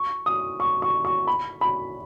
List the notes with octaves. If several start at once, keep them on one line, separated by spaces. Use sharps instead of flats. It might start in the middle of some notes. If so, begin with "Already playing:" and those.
Already playing: C#6
D#6
C#6
C#6
C#6
B5
B5